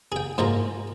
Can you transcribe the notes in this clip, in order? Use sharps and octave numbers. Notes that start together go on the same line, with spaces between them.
G#4 G5
G#2 G#3 A#3 F4 A#5